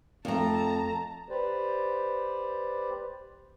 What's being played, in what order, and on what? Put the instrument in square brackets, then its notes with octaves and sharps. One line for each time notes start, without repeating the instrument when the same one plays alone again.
[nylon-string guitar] F2 A3 [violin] A5 A#5
[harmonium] G4 B4 C5 D5